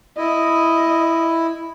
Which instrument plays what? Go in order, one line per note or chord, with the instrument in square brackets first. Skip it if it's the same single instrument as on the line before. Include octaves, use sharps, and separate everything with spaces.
[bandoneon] E4 [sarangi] D#5